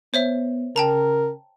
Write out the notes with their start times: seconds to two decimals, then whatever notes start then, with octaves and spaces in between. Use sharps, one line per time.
0.14 B3 C5 C#5 E5
0.76 C#3 A#4 G5 A5 A#5